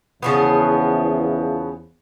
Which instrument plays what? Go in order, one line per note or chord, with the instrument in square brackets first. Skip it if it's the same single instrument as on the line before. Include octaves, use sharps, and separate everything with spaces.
[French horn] E2 [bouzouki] C#3 F3 B3